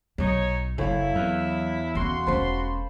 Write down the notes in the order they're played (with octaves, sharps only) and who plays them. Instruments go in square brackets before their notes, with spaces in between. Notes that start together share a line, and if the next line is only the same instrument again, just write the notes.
[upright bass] B1 F#3 [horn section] D#4 C#5
[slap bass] F#1 [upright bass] F#3 [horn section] E4 [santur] A4 C#5 F5
[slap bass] E2 [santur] B4 B5
[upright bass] B3 C#4 [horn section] F#4 C6
[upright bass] E1 C#4 [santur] C5 A5 B5